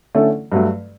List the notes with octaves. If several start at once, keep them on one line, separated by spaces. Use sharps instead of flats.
D3 A3 C#4 E4 A4
G2 F#3 A3